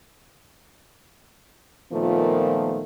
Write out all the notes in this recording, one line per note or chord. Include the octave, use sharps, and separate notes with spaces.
A#2 D#3 F3 A3 B3 F4